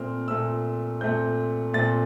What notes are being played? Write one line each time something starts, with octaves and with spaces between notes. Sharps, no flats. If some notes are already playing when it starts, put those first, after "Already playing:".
Already playing: A#2 A3 C4 F6
A#2 A3 C4 E6
A#2 A3 C4 G6
A#2 A3 C4 A6